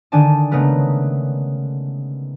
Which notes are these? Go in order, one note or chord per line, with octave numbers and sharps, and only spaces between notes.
D3 D#3 D4 G#5 A5
C#3 G#3 A3 B3 A#4 B4